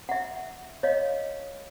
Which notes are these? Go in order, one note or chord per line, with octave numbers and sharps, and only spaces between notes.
E5 F#5
C#5 D#5 F5